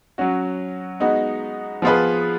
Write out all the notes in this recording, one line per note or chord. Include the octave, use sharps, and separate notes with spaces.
F#3 C#4 F#4
G#3 B3 D#4 F#4
F3 B3 F4 G#4 B4